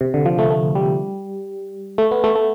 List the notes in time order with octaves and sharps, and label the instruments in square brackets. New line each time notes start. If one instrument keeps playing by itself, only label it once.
[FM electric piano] C3
D3
F3
A3
A3
G3
A3
B3
A3
A3